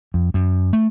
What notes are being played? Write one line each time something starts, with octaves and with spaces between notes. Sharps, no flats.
F2
F#2
A3